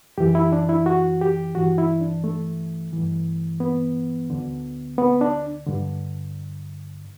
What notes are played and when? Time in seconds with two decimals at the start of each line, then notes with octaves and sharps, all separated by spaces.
0.18 F#2 E3 G4
0.35 E4
0.52 D4
0.69 E4
0.86 F#4
1.21 G4
1.55 G2 E3 F#4
1.78 E4
2.01 D4
2.24 A3
2.93 G2 E3
3.60 B3
4.30 D2 D3
4.98 B3
5.21 D4
5.66 G2 D3